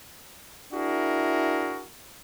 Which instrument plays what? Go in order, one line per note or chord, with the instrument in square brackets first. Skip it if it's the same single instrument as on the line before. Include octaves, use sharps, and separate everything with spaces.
[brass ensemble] D4 E4 F#4 G#4 A#4